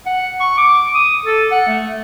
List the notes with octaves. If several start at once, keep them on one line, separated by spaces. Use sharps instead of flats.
F#5
C#6
D6
D#6
A4
F#5
A3